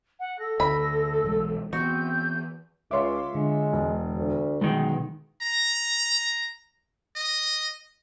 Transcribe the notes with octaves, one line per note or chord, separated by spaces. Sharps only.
F#5
A4 A#6
D2 B5
B1 E3 G#3
E3 B3 C4 F#4 G6
C#2 F4 C#5 E5 C6 D6
D3 G#3
E1
D2
B1 B2 D#3 G#3
A#5
D#5